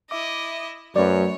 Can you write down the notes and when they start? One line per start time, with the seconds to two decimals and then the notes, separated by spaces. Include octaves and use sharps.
0.11 E4 D#5 E5 D6
0.96 F#2 F#3 A3 B4 C#5 D5